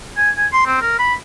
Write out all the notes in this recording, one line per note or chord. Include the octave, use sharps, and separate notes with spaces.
G#5
G#5
C6
C4
A#4
B5